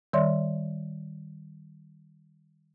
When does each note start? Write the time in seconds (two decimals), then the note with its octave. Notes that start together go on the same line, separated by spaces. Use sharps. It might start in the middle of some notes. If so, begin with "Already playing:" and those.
0.13 D#3 G3 C#5 D5 E5 C6